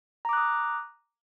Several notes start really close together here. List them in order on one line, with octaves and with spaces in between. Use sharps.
A#5 D6 F#6 D#6